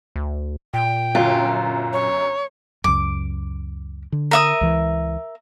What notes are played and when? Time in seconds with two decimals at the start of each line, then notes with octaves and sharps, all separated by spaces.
0.16 D2
0.74 A#2 G5
1.15 G1 F#2 F4
1.93 C#5
2.84 C#2 F#2 D6
4.12 D3
4.31 A#4 E5 D#6
4.61 C#2 E3